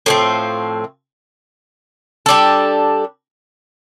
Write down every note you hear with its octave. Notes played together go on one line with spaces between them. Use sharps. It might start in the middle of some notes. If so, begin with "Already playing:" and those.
A2 F3 C4
G3 D4 A4